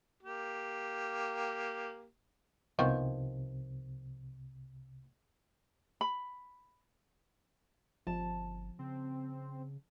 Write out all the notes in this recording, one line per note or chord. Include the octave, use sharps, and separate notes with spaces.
A#3 G4
C2 C3 D#3 F3 B3
B5
G1 F3 A5
C#3 C4